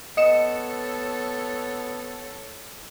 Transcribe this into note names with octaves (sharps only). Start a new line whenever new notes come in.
B3 A4 C#5 D#5 C#7 E7